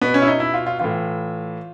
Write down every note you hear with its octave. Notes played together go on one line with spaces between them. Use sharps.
B2 B3
C#4
E4
D#4
E4
F4
F4
A2 E3 F4